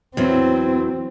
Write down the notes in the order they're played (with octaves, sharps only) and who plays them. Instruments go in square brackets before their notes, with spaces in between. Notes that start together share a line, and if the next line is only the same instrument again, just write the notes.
[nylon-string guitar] E2 F#3 [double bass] C4